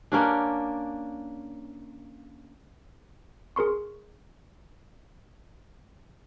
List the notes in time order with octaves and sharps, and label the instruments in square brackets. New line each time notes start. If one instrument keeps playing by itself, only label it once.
[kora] A#3 C#4 D4
[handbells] G#4 A#4 C6 C#6